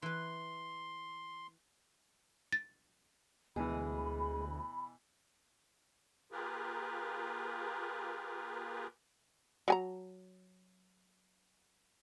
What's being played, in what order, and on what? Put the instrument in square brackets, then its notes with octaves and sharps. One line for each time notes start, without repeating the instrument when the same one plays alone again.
[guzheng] E3 B4 [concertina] C6
[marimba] A6
[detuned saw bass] D2 [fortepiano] B2 E3 [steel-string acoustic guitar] G#3 G#4 [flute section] B5
[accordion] A#3 F4 G4 G#4 A#4 B4
[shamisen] F#3 G#5 A#5